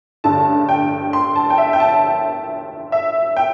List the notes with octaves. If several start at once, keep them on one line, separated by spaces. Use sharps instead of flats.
A1 G2 D3 A5
G5
C6
A5
G5
E5
G5
A5
E5
G5